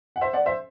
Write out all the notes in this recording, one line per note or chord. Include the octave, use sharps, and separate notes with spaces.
F#5
C5 E5
D5 F#5
C5 E5